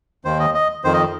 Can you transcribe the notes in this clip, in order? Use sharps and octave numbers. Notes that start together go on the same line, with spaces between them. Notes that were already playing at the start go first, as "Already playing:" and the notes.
D#2 D#3 C5
D#5
D#5
F2 D#3 C5
D#5